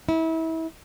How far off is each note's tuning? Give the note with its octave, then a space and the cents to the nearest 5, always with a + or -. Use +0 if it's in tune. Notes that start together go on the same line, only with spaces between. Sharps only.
E4 -30